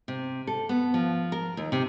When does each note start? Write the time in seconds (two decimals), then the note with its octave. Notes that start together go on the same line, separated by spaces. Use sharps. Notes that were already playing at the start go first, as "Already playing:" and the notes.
0.08 C3
0.47 A4
0.69 B3
0.94 F3
1.32 A#4
1.57 D#2
1.72 C3